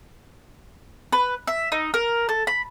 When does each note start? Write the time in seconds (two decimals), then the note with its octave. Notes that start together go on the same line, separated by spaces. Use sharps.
1.12 B4
1.47 E5
1.72 D#4
1.94 A#4
2.29 A4
2.47 B5